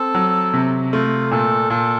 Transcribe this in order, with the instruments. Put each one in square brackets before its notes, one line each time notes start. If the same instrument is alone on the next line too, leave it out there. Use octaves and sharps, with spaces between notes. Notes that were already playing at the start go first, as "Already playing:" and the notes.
Already playing: [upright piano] C4 [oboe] A4
[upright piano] F#3
C3
[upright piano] A3 [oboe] F4
[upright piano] A#2 [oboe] A4
[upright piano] A#2 [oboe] A4